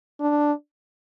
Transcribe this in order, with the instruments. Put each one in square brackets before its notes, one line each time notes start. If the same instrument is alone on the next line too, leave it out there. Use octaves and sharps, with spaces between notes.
[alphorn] D4